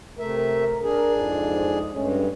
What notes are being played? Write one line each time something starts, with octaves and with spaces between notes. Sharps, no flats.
C3 A3 A#4 E5
D4 G#4 A#4
F2 G#2
G2 G#3 A3 C#4